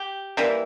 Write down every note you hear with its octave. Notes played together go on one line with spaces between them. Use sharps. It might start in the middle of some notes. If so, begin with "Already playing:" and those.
Already playing: G4
E3 G3 A#3